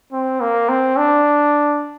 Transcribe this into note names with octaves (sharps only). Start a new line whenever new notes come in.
C4
A#3
C4
D4